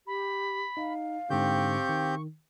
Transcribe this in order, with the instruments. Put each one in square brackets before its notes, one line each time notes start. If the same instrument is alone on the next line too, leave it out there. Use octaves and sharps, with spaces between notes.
[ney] G4 [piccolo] B5
[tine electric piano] D#4 [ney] F5
[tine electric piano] G#2 D3 [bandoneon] C4 G4 G6 [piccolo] C#6
[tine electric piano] D#3